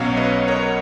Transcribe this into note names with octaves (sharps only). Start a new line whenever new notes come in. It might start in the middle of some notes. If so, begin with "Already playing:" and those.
Already playing: B1 B2 F#3 C#4 C#5 F5
B4 D#5
A#4 C#5